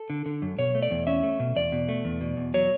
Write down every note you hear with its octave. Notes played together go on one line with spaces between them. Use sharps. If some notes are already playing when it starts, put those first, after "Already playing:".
Already playing: A4
D3
D3
F#2
B2 C#5
A3
D5
E2
C#4 E5
A3
B2
E2 D5
B2
A3
E2
B2
E2
F#3 C#5